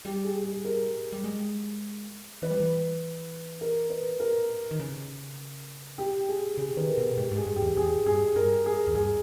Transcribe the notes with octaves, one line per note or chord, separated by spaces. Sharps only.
G3 G4
G#4
G#4
A#4
G3
G#3
E3 B4
G3
E3
A#4
B4
A#4
D#3
C#3
G4
G#4
C#3 G#4
D#3 B4
A#4
B2
G#2 G4
G#2
G#4
G2
G4
E2
E2 G#4
G2 G#4
G2 A#4
G#4
E2
G2 G#4